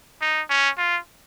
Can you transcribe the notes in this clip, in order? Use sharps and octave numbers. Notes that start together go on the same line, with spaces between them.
D#4
C#4
F4